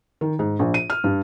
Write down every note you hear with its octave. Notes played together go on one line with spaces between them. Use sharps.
D#3
G#2
A#1
D#7
F6
G2